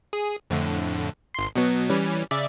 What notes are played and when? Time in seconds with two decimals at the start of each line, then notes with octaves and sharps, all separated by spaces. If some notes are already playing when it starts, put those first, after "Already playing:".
0.13 G#4
0.50 F2 A2 D3
1.34 G#1 C6
1.56 B2 F#3 B3
1.90 E3 G3 C#4
2.31 C#3 D5 E5